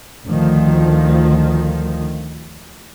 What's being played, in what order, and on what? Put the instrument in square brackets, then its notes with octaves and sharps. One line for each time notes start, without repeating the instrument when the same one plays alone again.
[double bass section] D2 D#3 F3